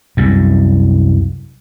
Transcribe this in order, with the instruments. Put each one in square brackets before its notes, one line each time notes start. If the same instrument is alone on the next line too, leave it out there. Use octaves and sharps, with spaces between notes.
[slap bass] C2 F#2